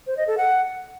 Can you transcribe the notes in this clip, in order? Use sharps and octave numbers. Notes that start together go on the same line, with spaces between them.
C5
D#5
A4
F#5